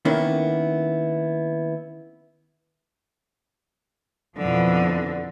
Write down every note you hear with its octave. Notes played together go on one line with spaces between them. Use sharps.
D#3 A#3 B3 C#4 E4
F2 B2 D3 E3 F3